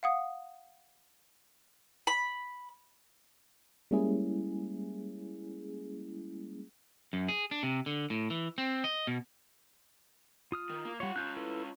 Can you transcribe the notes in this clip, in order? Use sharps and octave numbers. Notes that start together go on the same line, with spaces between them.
F5 F#5 D#6
B5
G3 G#3 A#3 C#4 E4 G#4
F#2
G#4
D4
C3
D3
A2
E3
C4
D#5
B2
F4 D#6 F6
D#3
A#3
G3 F4 C#5 F#5
C#4 F4 F#6 G6
E4 A4 B4